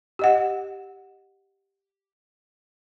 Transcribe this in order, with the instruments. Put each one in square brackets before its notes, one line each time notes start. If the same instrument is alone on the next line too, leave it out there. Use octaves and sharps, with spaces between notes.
[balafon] G4 D#5 F#5